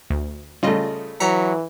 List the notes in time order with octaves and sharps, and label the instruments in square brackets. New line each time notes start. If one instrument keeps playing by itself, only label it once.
[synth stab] D2
[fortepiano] C#3 A3 [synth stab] G3 F4 D#5
[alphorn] E3 [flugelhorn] F#3 [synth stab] A#5 B6 C#7